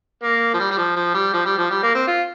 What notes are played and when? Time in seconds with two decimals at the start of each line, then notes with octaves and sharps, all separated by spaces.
0.23 A#3
0.54 F3
0.60 G3
0.71 G3
0.78 F3
0.96 F3
1.14 G3
1.34 F3
1.45 G3
1.58 F3
1.70 G3
1.83 A#3
1.95 C4
2.07 F4